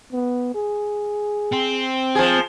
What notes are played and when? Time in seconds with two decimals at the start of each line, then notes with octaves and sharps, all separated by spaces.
0.13 B3
0.55 G#4
1.53 C4
2.15 F3 G#4